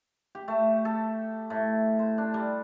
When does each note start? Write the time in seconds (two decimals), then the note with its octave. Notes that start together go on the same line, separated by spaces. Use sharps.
0.35 G4
0.48 A3
0.85 A4
1.50 A2
1.99 C5
2.18 D4
2.34 G3